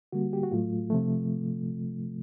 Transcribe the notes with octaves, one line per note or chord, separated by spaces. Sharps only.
D3 G3 A#3 F#4
G4
F#4
A2 F#3 A3 F4
C3 F3 A3